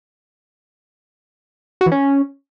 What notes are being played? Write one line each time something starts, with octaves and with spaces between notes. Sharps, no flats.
F#4
E3
C#4